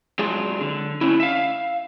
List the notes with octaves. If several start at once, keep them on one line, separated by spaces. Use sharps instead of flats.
F#3 G#3 D4 F4 G#4
D3
A3 C#4 D4 E4
E5 F5